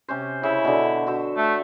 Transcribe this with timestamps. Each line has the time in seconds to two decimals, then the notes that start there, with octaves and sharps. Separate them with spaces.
0.08 C3 C#4 C5
0.43 C#3 E4
0.65 B2 D3
1.07 F#4 C5 E5
1.37 A3